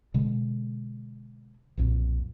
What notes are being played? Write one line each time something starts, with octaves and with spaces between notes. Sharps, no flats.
B2 D3 G#3
B1 F2 A#2